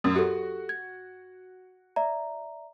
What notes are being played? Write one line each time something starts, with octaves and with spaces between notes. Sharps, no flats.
F#2 D#6
F#4 G4 A4
G#6
D5 E5 A#5